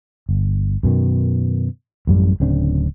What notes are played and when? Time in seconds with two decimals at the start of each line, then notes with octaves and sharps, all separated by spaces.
0.29 G1
0.83 F#2 B2 D#3
2.07 A1 F#2 G3
2.40 D1 C#3 C4 D4